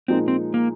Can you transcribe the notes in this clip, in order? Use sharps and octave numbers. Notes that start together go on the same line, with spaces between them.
A#2 F3 G#3 C4 D#4 A#4
C4
A#3